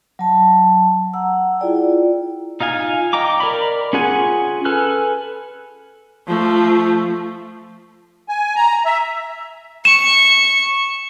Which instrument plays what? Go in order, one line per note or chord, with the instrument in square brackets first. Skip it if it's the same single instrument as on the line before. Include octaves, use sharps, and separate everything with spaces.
[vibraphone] F#3 A5
F#5 A#5 E6
E4 F4 G#4 D5 G5
[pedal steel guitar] D#4 F4 F5 G#5
D#5 G5 A#5 D6
A#4 D5 B5
C#4 F4 G#4 F#5 G#5
A4 B4 G#5 F6 F#6
[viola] F3 A3
[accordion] G#5
A#5
E5
[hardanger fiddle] C#6 [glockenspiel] E7